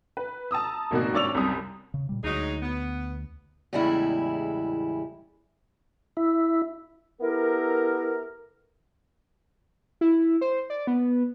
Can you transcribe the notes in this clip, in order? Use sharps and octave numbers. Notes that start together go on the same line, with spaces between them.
B4
A5 A#5 D#6 E6
G#1 B2 A#3 D#4 F#4
G#1 G2 C#5 D5 E6 F7
C2 F#2 C3 G3 D#6
C#3
A#2 G3
D2 F#3 G#3 D#4
B3
E2 A2 C#3 G3 G#3 E4
E4
B3 E4 G4 A4 A#4
E4
C5
D5
B3